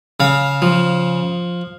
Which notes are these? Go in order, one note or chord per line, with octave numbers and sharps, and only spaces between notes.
C#3 F5
F3